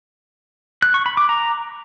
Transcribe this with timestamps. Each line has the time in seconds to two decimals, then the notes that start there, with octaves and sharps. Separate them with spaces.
0.82 F#6
0.94 C#6
1.06 B5
1.17 D6
1.29 A#5